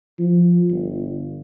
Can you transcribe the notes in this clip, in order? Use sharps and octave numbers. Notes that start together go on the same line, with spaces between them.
F3
G1